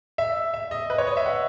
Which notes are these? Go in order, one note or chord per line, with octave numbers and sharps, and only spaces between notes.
E5
E5
D#5
B4
C#5
D#5
E5
F#5